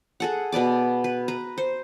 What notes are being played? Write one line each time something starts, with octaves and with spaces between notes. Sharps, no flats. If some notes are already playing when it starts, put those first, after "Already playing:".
G#4 A4 F#5
B2 B4 D5 D6
B4
B4 A#5
C5